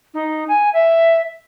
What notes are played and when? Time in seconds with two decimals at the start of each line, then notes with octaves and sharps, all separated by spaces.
0.14 D#4
0.48 G#5
0.73 E5